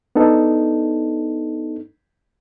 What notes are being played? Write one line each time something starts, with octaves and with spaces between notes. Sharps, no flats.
B3 D4 D#4 A4